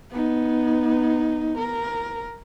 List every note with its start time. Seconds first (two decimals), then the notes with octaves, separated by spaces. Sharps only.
0.11 B3 D#4
1.58 A#4